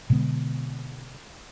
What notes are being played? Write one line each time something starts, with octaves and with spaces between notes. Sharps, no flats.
B2 D3 G#3 B3